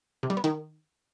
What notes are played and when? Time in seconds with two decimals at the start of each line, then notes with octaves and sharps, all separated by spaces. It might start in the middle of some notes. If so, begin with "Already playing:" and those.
0.23 C3
0.30 G3
0.37 B3
0.44 D#3